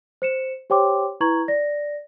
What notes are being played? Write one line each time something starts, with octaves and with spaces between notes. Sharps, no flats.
C5 C#7 E7
G4 C5 C#5 G5 C6 D6
E4 B4 A#5 C#6 G#6 F#7
D5 A#6